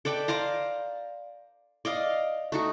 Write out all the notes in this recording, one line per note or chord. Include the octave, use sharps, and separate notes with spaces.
A4 B4 D5 G5
C5 D5 F5 A#5
D5 D#5 F5
A3 D#4 F#4